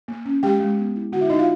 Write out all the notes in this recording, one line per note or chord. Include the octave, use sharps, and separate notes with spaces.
A#3
C#4
G#3 G4 G5
G#3
B3
E4
D3 F#4 F#5
E4 E5
D4 D#4 D#5
F4 F5